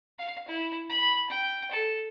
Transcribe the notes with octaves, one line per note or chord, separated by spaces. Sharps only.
F5
E4
B5
G5
A4